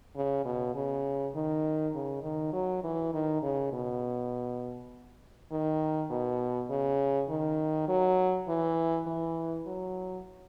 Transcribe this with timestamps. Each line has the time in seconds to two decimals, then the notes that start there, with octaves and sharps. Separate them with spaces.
0.16 C#3
0.45 B2
0.75 C#3
1.35 D#3
1.94 C#3
2.23 D#3
2.53 F#3
2.83 E3
3.13 D#3
3.42 C#3
3.73 B2
5.51 D#3
6.10 B2
6.70 C#3
7.30 D#3
7.88 F#3
8.48 E3
9.07 E3
9.66 F#3